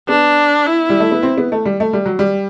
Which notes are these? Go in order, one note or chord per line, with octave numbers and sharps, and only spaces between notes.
B3 D4
E4
G3
A3
B3
C4
B3
A3
G3
A3
G3
F#3
G3